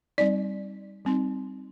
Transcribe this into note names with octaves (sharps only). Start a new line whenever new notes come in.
G3 C4 D#4 D5
G3 C4 D#4